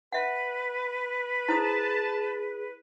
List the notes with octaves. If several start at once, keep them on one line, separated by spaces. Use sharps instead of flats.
B4 E5 F#5
E4 G#4 C5 A5 D#6